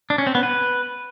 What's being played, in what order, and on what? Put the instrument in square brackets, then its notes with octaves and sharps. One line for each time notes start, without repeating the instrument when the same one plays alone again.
[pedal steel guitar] D4
C#4
C4
B3
B4